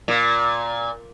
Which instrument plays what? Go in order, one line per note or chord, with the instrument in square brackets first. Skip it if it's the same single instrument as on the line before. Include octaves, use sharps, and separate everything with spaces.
[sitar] A#2